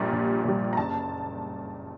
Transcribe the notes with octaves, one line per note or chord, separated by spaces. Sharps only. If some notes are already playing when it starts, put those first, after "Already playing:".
Already playing: A#1 A#2 G3 A#5
A#1
A#2 G3
A#5
F#1 A5